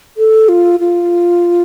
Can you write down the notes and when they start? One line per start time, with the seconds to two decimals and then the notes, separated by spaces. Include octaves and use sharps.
0.17 A4
0.49 F4
0.80 F4